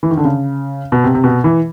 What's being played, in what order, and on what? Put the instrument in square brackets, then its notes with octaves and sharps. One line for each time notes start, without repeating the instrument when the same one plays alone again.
[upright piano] E3
D#3
D3
C#3
B2
C3
C3
B2
E3